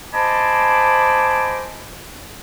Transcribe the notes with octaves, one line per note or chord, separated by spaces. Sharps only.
C5 D#5 G#5 A5 B5 D6